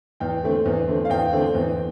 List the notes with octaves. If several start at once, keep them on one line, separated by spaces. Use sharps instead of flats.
E2 G5
D3 A3 C4
E2
D3 A3 C4
F5
E2 G5
D3 A3 C4
E2